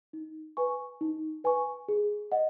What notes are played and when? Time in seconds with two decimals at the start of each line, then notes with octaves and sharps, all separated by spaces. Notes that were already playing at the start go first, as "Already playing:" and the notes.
0.13 D#4
0.57 B4 G#5 C#6
1.01 D#4
1.44 B4 G#5 C#6
1.88 G#4
2.32 D#5 F#5